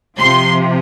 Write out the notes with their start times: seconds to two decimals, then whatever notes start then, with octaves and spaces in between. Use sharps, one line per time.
0.18 C3 F3 C6